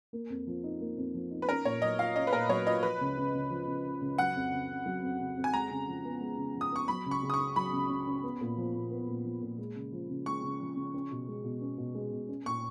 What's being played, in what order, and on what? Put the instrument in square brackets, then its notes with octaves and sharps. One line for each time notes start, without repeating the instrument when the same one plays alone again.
[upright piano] A#3
F2
F3
D#4
A#3
F2
F3
D#4
[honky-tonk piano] B4
[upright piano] C#4 [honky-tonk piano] A#4
[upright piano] A#2 [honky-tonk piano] C#5
[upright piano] F#3 [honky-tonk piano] D#5
[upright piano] F4 [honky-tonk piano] F5
[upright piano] C#4 [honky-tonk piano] D#5
[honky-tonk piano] B4
[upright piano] A#2 [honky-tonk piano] A#4
[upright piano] F#3 [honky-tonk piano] C#5
[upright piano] F4 [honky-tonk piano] D#5
[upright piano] F3 [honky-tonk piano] B4
[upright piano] C#2
C#3
C#2
F3
C#2
C#3
C#2
[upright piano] F#3 [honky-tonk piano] F#5
[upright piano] F2
C#3
F2
F#3
F2
C#3
F2
[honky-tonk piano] G#5
[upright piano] G#3 [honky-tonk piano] A#5
[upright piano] C#3
F3
B3
G#3
C#3
F3
[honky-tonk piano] D#6
[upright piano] B3 [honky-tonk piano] C#6
[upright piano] F#3 [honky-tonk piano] B5
[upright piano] C#2
[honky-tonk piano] C#6
[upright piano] C#3
[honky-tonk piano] D#6
C#6
[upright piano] C#4
[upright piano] F#3 [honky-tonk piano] B5
[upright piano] C#2
C#3
C#4
B3
A#2
F3
A#2
B3
A#2
F3
A#2
G#3
C#3
F3
C#3
[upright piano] G#3 [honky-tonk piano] C#6
[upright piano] C#3
F3
C#3
C#4
B2
G#3
B2
C#4
B2
G#3
B2
C#4
[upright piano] A#2 [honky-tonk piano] C#6